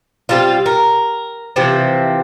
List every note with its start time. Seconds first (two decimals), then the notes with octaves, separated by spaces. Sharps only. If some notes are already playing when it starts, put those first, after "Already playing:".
0.29 G3 C4 F4
0.66 A#4
1.56 C3 E3 F3 C4